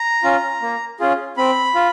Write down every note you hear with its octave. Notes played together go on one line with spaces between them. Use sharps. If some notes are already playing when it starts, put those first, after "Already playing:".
Already playing: A#5
C#4 F4
A#3
C#4 F4 G#4
C4 B5
F4